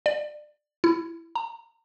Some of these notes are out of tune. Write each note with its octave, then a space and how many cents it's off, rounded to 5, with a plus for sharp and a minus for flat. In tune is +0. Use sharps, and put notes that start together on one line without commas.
D5 +25
E4 +15
A#5 -30